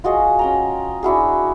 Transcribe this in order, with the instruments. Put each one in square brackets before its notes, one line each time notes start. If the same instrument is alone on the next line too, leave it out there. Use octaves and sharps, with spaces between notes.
[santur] F4 F#4 G#4 D#5
C#4 G5 A#5
D4 E4 F#4 G#4